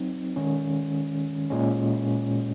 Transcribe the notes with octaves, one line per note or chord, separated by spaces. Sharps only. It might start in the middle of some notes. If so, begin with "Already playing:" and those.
Already playing: F#3 C4 D#4
D#3 G#3 C#4
A#2 G#3 C#4